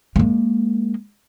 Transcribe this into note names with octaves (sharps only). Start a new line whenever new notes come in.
G#3 A#3